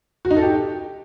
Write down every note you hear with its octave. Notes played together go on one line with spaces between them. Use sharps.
F#4
D#4
A4
G4